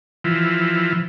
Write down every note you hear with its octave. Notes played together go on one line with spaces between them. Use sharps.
E3 F3